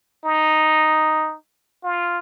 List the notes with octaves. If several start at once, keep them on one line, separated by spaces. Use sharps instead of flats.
D#4
F4